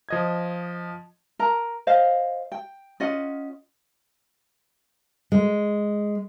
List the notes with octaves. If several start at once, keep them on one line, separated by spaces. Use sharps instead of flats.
F3 D#5 G#6
A#4 A#5
C5 D#5 F5
G5
C#4 F4 D#5 F#5
G#3